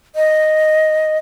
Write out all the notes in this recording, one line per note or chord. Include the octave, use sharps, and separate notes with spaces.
D#5